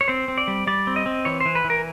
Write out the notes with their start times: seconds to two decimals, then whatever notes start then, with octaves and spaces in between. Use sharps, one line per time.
0.01 C#5
0.08 C4 C5
0.28 C4
0.38 D5
0.48 G3
0.67 G3 D5
0.87 C4
0.96 D#5
1.06 C4
1.25 E3 C#5
1.41 E3 C5
1.55 B4
1.65 E3
1.70 A#4